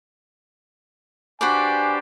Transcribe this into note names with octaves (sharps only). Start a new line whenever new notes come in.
D4 F#4 G4 B4 C5 D5 G#5